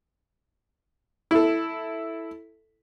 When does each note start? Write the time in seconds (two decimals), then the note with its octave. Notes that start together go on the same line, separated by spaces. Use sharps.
1.31 E4 A4